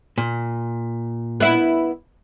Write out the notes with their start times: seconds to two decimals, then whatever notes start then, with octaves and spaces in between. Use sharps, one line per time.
0.18 A#2
1.40 B3 E4